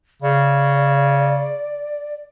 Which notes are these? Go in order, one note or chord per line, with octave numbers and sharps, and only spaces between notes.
C#3 D5